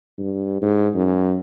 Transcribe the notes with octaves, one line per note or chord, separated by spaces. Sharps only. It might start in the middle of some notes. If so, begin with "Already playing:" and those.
G2
G#2
F#2